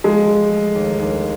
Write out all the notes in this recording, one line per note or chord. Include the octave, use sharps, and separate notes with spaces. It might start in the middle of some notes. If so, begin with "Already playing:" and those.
F3 G#3
F3
A3
D#2
D#2